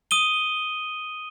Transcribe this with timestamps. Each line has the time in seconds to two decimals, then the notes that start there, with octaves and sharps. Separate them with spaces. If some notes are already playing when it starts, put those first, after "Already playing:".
0.11 D#6 D#7 G7